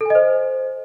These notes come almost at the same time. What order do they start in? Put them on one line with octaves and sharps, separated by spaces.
A4 G#5 D#5 C5